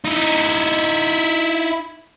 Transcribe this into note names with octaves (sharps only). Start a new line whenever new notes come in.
D#4 E4